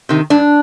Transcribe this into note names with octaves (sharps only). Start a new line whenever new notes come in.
C3 D#3
G2 D4